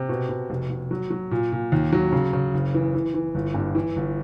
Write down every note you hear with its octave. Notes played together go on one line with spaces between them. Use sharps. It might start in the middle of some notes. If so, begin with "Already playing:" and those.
Already playing: C3
B2
B2
F1
F1
F#3
F#3
A#2
A#2
D#2
F#3
C#3
C#3
F#1
E3
E3
E3
G1
G2
E3
G1